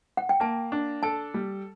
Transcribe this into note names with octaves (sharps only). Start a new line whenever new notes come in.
F#5
G5
A#3 A5
D4
A4 A5
G3